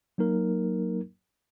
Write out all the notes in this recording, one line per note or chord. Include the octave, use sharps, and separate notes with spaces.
F#3 A#3 D#4 A#4